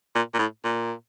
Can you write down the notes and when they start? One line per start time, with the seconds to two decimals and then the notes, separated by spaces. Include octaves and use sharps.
0.15 A#2
0.34 A#2
0.39 A2
0.63 A#2